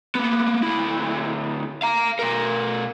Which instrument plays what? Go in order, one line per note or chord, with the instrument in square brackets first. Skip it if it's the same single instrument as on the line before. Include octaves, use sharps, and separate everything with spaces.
[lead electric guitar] A#3 B3
D2 E4
F5 A#5
B2 A#4